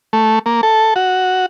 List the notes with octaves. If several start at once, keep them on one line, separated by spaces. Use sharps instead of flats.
A3
A#3
A4
F#4